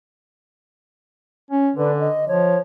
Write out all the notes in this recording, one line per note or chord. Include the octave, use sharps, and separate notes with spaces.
C#4
D3 D4 B4
D#5
F3 C#5